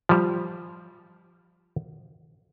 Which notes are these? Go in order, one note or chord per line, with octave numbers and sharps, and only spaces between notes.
F3 G3